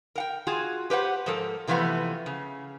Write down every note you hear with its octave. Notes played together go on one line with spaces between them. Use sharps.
A#4 F#5 G5
F4 F#4 G#4
G4 B4 C5 F#5
G#2 F3 A4 A#4
C3 E3 F3 A3 B3
C#3